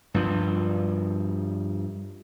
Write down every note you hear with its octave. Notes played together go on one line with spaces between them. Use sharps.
G2 F3